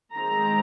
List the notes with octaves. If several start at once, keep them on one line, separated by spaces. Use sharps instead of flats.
D#3 G#3 C4 A#5